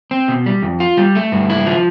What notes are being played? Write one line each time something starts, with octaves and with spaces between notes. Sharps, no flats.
C4
B2
G3
F2
F4
G3
A3
G2
E4
F3